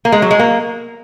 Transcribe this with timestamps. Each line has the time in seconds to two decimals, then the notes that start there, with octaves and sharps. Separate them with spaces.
0.05 A#3
0.12 G#3
0.22 F#3
0.31 G#3
0.39 A#3